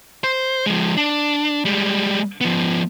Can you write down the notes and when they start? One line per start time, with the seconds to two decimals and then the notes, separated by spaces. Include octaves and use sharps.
0.24 C5
0.66 F3 G#3
0.97 D4
1.65 G3 G#3
2.41 F3 B3